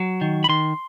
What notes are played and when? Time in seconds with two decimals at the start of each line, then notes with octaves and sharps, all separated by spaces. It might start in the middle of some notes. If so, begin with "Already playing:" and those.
Already playing: F#3
0.21 D#3
0.44 B5
0.49 D#3 C6